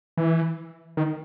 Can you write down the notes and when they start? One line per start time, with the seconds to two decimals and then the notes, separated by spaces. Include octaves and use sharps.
0.17 E3
0.97 D#3